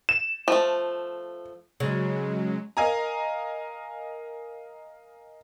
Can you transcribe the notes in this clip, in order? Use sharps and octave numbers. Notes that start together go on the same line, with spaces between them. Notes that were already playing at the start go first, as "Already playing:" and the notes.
E7
F3 A3
C#3 F#3 G#3
A#4 D#5 F5 G#5 A#5